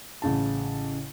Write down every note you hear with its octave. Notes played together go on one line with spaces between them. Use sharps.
A1 C#3 A5